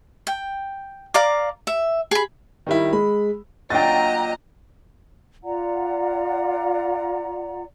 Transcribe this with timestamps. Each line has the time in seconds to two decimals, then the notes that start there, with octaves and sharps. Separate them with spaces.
0.27 G5
1.14 D5 F5 A#5 D6
1.67 E5
2.11 G#4 B5
2.67 D#3 G3 E4
2.93 G#3 B5
3.70 A#2 F#3 D4 D#5 G5 A#5 A6
5.43 F4 D5 F#5 A#5